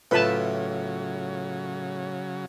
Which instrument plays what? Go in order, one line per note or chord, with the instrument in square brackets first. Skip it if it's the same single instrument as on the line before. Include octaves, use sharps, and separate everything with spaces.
[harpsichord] A2 [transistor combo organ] C#3 F#3 [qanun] F4 E5 G5 [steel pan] B4 A5